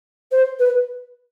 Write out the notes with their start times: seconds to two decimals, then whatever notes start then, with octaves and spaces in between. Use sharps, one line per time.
0.31 C5
0.59 B4